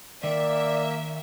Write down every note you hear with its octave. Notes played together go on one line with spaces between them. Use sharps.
D#3 A#3 A#4 D5 E5